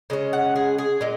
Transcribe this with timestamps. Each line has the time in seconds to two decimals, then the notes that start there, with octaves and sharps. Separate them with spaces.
0.10 C#3 G#3 C#4 D#5
0.33 F#5
0.56 G#4
0.78 G#4
1.01 A#2 G#3